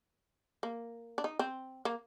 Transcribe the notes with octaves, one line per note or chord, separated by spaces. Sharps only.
A#3
D4
D#4
C4
A#3